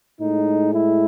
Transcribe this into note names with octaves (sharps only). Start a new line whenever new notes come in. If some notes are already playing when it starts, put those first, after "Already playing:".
A2 G#3 D#4
E4